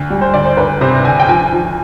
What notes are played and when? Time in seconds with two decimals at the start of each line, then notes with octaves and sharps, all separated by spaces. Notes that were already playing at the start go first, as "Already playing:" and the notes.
Already playing: D2
0.10 G3
0.21 C5
0.33 D2 D5
0.45 C5
0.57 D2 B4
0.81 C3 C5
1.05 D2 G#5
1.20 G5
1.29 F3 G#5
1.53 F3